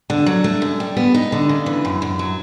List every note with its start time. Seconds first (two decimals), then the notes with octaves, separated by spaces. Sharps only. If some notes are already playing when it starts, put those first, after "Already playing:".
0.10 D3
0.26 F#3
0.44 A3
0.62 F#2
0.80 G3
0.97 B3
1.14 D#4
1.32 D3
1.49 C#3
1.66 E3
1.85 F#2
2.02 F#2
2.19 F#3